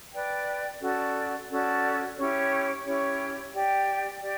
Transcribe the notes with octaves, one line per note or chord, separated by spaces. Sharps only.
B4 D5 G5
C#4 F#4 A4 D5
C#4 F#4 A4 D5
C#4 E4 G4 C#5
C#4 E4 G4 C#5
G4 D5 G5
G4 D5